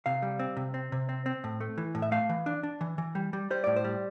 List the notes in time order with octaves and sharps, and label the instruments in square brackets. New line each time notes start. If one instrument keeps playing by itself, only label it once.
[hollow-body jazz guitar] C3 F5
G3
C4
C3
C4
C3
C4
C4
A2
A3
E3
A2
E5
A3 F5
E3
D4
D4
E3
E3
G3
G3
G3 C5
A2 D5
C5
G3